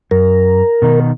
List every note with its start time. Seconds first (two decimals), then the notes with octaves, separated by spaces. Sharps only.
0.11 F#2 A#4
0.82 B2 D#3 D#4